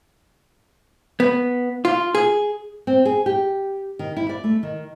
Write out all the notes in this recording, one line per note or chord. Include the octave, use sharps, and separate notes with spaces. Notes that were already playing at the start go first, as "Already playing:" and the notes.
B3
F4
G#4
C4
G#4
G4
D#3
E4
D5
A3
D#3